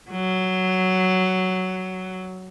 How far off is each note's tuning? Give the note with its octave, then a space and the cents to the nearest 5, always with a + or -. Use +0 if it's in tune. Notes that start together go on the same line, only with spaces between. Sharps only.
F#3 +10